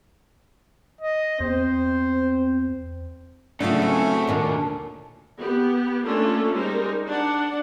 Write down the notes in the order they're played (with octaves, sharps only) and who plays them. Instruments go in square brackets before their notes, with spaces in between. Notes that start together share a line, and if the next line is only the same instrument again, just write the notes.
[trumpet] D#5
[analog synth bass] E2 [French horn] C4 [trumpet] C5
[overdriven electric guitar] A2 A4 [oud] C#3 F#3 [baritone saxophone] A3 [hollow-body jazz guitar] D4 F4
[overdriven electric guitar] D2 C#4 [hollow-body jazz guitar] C4 E4
[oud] D#2 A#2 D4
[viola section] B3 G4
A3 A#3 C#4 D4 F4 A4
G3 G#3 D#4 A#4 C5
D4 D5 F#5